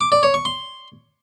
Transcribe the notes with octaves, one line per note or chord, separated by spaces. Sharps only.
D6
D5
C#5
C#6
C6